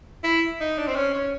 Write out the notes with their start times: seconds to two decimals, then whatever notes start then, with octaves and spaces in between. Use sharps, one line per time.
0.24 E4
0.60 D#4
0.78 D4
0.87 C4
0.96 C#4
1.14 C#4